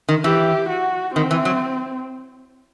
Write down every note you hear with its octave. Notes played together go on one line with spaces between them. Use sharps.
D#3
E3 G4
F#4
D#3 C4
E3
F#3